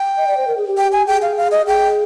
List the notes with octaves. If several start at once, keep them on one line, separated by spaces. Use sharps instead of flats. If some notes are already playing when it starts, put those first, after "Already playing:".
Already playing: G5
D#5
D5
C5
A#4
G#4
G4
G5
G#5
G#4 G5
F5
F5
D#5
G#4 G5